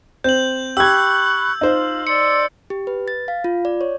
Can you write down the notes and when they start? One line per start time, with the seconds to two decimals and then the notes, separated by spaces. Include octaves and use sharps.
0.24 C4 G6 F#7
0.77 G4 B5 C#6 E6 F#6 G#6
1.61 D#4 F4 C5
2.07 D5 C6 E6 C#7
2.70 G4
2.87 B4
3.08 A6
3.28 F5
3.44 F4
3.65 D5
3.81 C#5